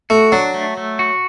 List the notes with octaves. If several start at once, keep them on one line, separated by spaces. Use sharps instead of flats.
A3 F#4
F#3 D4
A3
A3
F#4